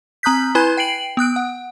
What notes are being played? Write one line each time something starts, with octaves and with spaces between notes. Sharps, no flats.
C4 A#5 D#6 F#6 G6 B6
E4 B4 G#5 B5 F#6 G#6
G5 C7 D7 F#7
B3 D#6 F#6 D7
F#5